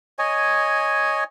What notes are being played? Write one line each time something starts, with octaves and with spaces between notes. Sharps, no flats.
C#5 D#5 G#5